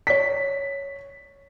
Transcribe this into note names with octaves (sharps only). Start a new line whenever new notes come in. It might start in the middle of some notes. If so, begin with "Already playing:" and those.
C#5 B6